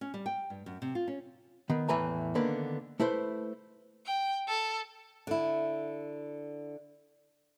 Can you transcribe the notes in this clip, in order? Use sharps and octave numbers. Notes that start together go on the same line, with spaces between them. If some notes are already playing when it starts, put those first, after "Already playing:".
C#4
G3
G5
G2
F#2
C3
F4
C#4
D#3 B3
E2 A2 E3 B4 G#5 A#5
D3 D#3 A#3 B3 B4
A3 E4 B4 C5
G5
A4
D3 E4